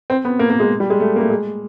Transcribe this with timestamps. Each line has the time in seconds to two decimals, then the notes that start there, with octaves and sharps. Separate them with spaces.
0.10 C4
0.25 B3
0.39 A#3
0.50 A#3
0.60 G#3
0.80 G3
0.90 G#3
1.00 A3
1.16 A#3
1.20 A3
1.30 G#3